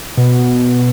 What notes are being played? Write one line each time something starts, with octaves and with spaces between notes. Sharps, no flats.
B2